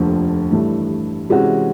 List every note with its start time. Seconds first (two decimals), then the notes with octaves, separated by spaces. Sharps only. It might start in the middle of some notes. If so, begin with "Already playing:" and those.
Already playing: F1 D#2 D3 F3
0.51 A1 G2 E3 A3 D4
1.30 C3 E3 G#3 C#4 F#4